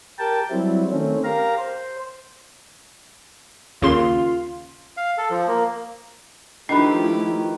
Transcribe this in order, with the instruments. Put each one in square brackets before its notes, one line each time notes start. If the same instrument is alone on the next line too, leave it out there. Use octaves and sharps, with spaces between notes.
[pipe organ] G4 A#4 G5 A5
F#3 G3 C4 E4
D#3 A3 C4 C#4
G4 A#4 F5 A#5
C5
[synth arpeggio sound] D#2 C#3 C6 [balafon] C#4 A#4 [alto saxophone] F4
[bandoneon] F5
A4
F3
A#3
[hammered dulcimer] D#3 B4 [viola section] F3 A3 E4 [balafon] D4 [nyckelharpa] G4